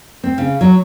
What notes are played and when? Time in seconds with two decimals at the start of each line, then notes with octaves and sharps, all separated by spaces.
0.24 C4
0.38 C#3
0.61 F#3